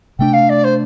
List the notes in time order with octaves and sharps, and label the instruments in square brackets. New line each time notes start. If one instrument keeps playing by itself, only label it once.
[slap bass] C3 A3 D4 [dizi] G5
[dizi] F5
D5
C5